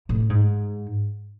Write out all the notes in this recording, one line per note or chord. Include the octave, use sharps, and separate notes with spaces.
A2
G#2